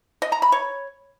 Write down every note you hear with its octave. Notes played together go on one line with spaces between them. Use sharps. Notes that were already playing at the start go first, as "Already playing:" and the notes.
D#5
A#5
B5
C#5